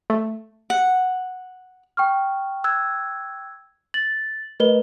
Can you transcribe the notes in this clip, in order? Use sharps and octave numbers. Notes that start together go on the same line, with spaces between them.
A3
F#5
G5 C#6 F6
E6 F#6 G#6
A6 F#7
A3 A#4 B4 D#5 G7